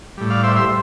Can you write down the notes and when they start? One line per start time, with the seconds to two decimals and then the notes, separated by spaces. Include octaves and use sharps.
0.17 A2 G3
0.30 D5 F5
0.44 C5 E5
0.56 C5 E5